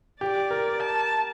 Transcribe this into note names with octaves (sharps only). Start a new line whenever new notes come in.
G4 D5
A#4
A5